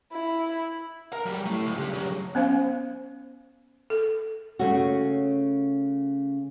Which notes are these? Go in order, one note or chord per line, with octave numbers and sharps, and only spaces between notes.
E4
A#4 A#5
F#3 G3
A3 E4
C#2
D4 G4
C#3 F#3
B3 C#4 C5 F5
A4
C#3 A3 C#4 F#4